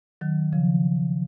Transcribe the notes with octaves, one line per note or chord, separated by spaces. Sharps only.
D#3 F#3
C#3 F3